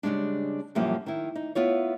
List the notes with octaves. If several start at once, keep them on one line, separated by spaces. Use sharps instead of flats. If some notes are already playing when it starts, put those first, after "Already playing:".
C#3 F3 G3 G#3 D4
F#2 A#2 E3 F3 G3 A#3
D#3 E4
D#4
B3 E4 F4 C#5